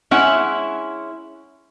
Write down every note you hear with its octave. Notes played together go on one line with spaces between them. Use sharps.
G#3 C#4 E4 E5 F#5